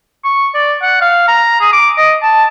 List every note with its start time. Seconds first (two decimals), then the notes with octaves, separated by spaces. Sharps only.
0.25 C#6
0.54 D5
0.82 F#5
1.01 F5
1.28 A#5
1.60 G#4
1.73 D6
1.98 D#5
2.23 A5